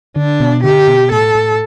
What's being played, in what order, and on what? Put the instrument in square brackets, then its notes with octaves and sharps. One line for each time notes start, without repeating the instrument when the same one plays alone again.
[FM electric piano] D3 [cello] D4
[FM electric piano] B2
[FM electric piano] D3 [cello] G4
[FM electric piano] B2
[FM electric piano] A2 [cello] A4
[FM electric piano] A2